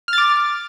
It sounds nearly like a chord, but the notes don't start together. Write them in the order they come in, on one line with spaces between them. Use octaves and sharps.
F6 A6 D6